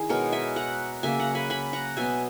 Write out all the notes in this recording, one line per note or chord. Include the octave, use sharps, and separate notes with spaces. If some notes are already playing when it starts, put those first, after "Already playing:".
Already playing: D#3 E4 G#4
B2 G#3 B3 A#4 C#5
E5 G#5
F#5 A#5
C#3 F#3 A#3 E5 G#5
F#5 A#5
G#5 B5
G#5 B5
F#5 A#5
B2 F#3 B3 E5 G#5